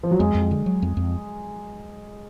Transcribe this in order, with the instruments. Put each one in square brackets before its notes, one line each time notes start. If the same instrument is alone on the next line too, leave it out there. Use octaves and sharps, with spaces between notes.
[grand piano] F3
F#3
[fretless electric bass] F2 [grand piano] G#3
[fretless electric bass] F2
D3
F#3
F2
F2